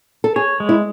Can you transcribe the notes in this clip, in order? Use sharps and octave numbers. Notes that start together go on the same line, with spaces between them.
A4
G#4 C#5
G#3
E4